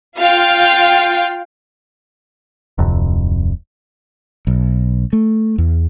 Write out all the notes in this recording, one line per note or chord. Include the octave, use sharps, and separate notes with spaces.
F4 F5 G5
D1 F2 C3
B1
A3
E2